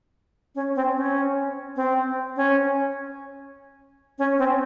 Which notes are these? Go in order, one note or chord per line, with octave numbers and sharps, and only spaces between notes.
C#4
C4
C#4
C4
C#4
C#4
C4